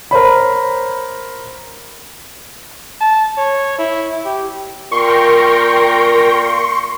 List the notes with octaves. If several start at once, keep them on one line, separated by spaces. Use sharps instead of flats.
A#4 C5 C#5 B5
A5
C#5
E4
G4
A#2 A#4 G5 A#5 C6 C#6